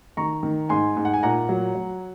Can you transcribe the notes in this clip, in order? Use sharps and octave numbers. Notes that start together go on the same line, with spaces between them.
D#3 A#5 C#6
D#3
G#2 G#5 C6
G#2
F#5
G#5
A#2 F#5 A#5
F#3
F#3